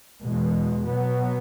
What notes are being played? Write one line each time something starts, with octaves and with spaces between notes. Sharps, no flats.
E2 B2 G#3
B2 F#3 B3